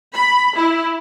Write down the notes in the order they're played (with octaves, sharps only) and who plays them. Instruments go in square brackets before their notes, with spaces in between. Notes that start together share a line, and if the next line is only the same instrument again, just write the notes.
[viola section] B5
E4